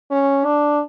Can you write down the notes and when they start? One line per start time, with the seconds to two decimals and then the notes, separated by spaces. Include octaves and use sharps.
0.11 C#4
0.45 D4